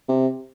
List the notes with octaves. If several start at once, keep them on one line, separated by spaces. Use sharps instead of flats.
C3